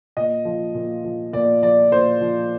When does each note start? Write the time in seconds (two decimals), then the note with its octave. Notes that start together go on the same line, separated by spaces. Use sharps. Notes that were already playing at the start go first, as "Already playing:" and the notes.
0.17 A#2 D#5
0.45 F3
0.75 A#2
1.04 F3
1.33 A#2 D5
1.63 F3 D5
1.91 A#2 C5
2.21 F3